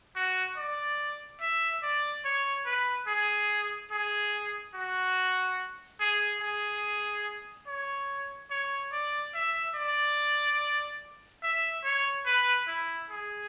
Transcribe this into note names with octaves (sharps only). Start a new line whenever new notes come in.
F#4
D5
E5
D5
C#5
B4
G#4
G#4
F#4
G#4
G#4
C#5
C#5
D5
E5
D5
E5
C#5
B4
E4
G#4